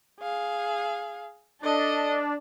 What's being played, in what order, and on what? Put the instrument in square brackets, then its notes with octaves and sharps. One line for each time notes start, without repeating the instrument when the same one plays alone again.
[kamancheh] G#4 F5
[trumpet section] D4 [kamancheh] A4 D#5